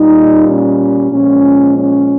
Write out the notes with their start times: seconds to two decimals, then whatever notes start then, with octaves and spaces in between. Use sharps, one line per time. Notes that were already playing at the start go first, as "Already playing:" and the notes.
Already playing: A#2 G3 D#4
0.47 C#4
1.11 A#2 F3 G#3 C#4
1.77 C#4